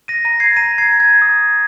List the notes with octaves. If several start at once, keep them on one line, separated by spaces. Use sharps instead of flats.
A#6 D#7
A#5 A#6 D#7
G#6 C7
A#5 A#6 D#7
G#6 C7
A#5
G#6
D#6